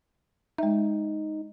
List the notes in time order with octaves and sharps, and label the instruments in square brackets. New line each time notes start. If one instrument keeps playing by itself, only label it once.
[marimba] G#3 E5 [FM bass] D#4